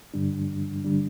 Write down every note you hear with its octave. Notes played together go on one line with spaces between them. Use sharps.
G2 D3 G3 D4
D3 G3 D4